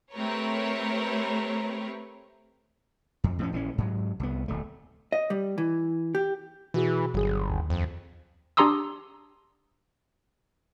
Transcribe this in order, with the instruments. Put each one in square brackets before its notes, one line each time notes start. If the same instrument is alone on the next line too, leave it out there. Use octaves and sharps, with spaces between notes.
[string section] A3 C4 G4 A#4 B4 C#5
[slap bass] F2
A2 F3 G#3 C#4
A#1 E3 F#3 C#4
G#2 F#3
C2 B3
D1 A3
[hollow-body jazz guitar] D#5
G3
E3
G4
[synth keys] B2 F#4 G#4 [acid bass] E3
[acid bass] G1 [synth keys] F#3 G#4
[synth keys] D#2
[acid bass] F2
[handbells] D4 G4 A#5 C6 D#6 E6